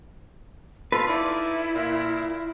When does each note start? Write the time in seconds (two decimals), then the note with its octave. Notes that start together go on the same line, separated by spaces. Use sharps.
0.92 F4 A4 B4 C6
1.08 D#4 E4 D5
1.74 A#2